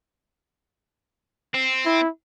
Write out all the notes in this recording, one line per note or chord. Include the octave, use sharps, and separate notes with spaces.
C4
E4